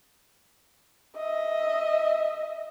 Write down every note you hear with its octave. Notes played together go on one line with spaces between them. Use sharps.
D#5 E5